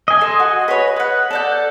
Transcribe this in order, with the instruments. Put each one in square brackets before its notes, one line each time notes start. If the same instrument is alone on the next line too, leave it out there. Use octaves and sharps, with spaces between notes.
[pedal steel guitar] D#5 G#5
[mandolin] A4 C6
F#4
B4 C#5
B4 F#5
A4 D5 G6